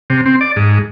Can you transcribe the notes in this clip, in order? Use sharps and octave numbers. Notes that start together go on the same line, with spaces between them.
C3
C4
D5
G#2